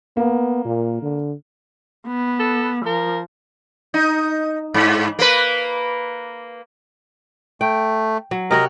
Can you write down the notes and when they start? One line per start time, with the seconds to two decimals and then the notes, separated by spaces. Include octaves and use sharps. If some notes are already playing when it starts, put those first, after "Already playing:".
0.17 A#3 B3
0.65 A#2
1.02 D3
2.07 B3
2.39 A4
2.86 F3 A#4
3.94 D#4
4.74 G#2
5.19 A#3 B4
7.61 A3 G5
8.31 F#3
8.51 C3 F#4 A#4 C#5 D#5